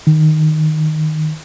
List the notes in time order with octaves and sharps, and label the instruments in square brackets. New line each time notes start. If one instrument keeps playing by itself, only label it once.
[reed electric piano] D#3